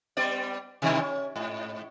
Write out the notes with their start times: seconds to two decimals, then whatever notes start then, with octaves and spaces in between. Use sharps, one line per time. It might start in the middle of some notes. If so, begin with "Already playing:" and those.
0.17 G3 B3 D5
0.82 B2 D#3 G3
0.99 C#4
1.36 G#2